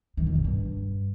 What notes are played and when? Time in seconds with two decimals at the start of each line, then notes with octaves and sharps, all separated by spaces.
0.17 D#3
0.26 F2
0.35 A#2
0.44 G2